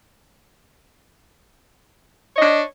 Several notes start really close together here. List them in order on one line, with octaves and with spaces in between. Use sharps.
C#5 D#5 D4